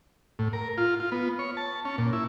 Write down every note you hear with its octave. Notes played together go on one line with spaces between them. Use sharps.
A2
A#4
F4
F4
B3
C#5
A5
C#4
A#2
E4